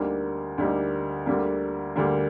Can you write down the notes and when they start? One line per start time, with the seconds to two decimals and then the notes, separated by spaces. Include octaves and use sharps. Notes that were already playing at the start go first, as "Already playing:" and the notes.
Already playing: D2 D3 G3 A#3 D#4
0.58 D2 D3 G3 A#3 D#4
1.26 D2 D3 G3 A#3
1.96 D2 D3 G3 A#3